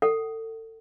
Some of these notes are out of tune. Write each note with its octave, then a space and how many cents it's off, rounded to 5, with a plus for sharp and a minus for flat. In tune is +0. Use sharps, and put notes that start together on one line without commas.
A4 +30 F#5 +30